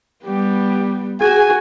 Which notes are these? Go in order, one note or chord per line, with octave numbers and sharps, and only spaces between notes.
G3 B3 G4
F#4 G#4 G#5